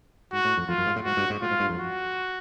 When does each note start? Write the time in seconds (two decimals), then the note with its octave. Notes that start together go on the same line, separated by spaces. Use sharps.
0.33 G#2 F#4
0.45 A2
0.57 F2
0.69 F2 F4
0.78 F#2
0.87 G#2
0.96 A2
1.05 G#2 F#4
1.17 G2
1.30 G#2
1.42 A2 F4
1.51 G#2
1.60 G2
1.69 F2
1.78 F#4